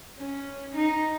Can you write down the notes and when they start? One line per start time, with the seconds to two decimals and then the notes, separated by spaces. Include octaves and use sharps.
0.20 C#4
0.76 D#4